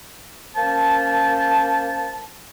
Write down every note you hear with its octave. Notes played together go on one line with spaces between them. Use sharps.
A#3 C#4 C5 A5